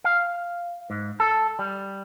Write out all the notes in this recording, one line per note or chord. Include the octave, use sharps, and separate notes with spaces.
F5
G#2
A4
G3